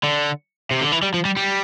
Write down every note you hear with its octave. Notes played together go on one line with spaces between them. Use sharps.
D3
C3
D3
E3
G3
F3
G3
G3